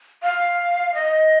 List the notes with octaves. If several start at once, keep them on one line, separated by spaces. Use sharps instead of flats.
F5
D#5